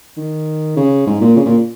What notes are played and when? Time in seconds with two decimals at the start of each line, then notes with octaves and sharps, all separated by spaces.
0.17 D#3
0.76 C#3
1.07 G#2
1.21 A#2
1.36 C#3
1.46 A#2